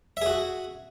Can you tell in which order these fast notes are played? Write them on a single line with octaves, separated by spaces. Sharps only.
E5 G#4 F#4